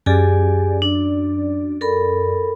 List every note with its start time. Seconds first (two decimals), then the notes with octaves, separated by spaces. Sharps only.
0.06 F#2 G4 G#4 D5 G#5
0.82 D4
1.81 A4 A#4 B5